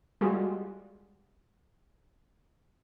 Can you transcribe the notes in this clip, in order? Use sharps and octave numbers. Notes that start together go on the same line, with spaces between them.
G3 G#3 F4 F#4